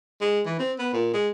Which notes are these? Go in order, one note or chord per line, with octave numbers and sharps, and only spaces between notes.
G#3
E3
C4
B3
A#2
G#3